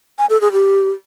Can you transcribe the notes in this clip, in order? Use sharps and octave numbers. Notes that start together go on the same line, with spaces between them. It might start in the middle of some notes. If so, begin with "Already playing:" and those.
G#5
A4
G#4
G4